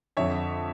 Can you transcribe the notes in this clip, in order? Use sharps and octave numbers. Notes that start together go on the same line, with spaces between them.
F2 D3 C#5 E5